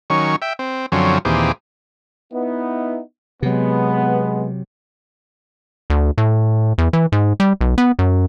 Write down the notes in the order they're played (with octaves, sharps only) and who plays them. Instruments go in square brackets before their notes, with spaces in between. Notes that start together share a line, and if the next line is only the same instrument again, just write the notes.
[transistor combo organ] D#3 F#3 C#4 C#6
E5 G5
C4
F#2 D3 F3 F#3 C4 C#4
D#2 A#2 E3 C4 G4 G#4
[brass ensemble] B3 D#4 E4
[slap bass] C3 F#3 [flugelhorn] G#3 [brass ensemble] B3
[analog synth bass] D2
A2
E2
E3
G#2
G3
B1
B3
F#2